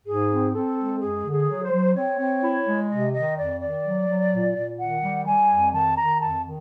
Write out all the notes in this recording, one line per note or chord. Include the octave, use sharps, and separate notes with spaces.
G#2 G#4
C4
C4 A4
G#3
F#2 G#4
D3
G#4
F#3
C5
F#3
C4 C#5
C4
E4
G#3
C3 D#5
D#3 D#5
F2 D5
D#3 D5
F#3
F#3
A#2
A#2
D#3 F#5
G3
G3 G#5
F2
D#3 A5
D#3 A#5
F2 A5
D#3